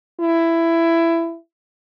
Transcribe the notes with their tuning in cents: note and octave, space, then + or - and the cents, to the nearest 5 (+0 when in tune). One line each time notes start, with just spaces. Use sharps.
E4 +15